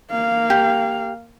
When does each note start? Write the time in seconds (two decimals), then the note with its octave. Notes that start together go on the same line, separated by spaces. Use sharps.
0.11 A#3 F5
0.50 G4